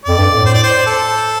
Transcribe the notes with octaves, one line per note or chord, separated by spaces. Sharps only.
F2 D5
G2
A2
C5
D5
C5
A4